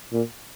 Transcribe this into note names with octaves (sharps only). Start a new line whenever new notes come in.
A#2